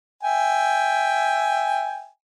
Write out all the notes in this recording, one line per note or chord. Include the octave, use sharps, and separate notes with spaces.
E5 G5 G#5